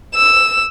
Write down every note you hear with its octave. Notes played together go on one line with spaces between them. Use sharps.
E6